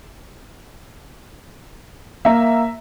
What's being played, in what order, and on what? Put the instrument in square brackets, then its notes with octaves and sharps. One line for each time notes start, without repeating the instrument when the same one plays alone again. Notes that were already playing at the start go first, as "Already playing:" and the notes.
[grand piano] A#3 [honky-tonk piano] E5 A#5